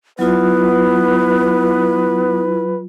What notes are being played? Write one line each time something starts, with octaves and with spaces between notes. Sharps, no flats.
F#3 B3 E4 F4 B4